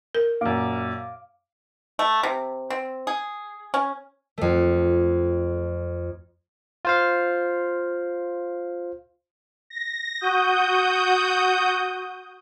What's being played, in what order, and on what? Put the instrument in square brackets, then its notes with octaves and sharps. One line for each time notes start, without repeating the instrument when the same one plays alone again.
[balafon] A#4
[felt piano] F#2 A#2 [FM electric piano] F5 D6
[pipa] A3
C3
C4
G#4
C#4
[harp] F2 A3
[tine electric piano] F4 C5 F5
[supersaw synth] A#6
F#4 D#6 G6